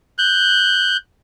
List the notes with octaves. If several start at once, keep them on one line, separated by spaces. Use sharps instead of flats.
F#6 G6